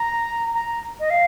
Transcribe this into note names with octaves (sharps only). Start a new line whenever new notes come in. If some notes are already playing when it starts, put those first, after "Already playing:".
Already playing: A#5
A#5
D#5
F5